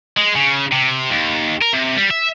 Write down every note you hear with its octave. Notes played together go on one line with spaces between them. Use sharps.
G#3
C#3
C3
D#2
A#4
C3
G3
E5